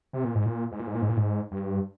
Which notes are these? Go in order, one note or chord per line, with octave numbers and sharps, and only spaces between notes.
C3
A#2
G#2
A#2
G#2
A#2
G#2
A#2
G#2
A#2
G#2
G2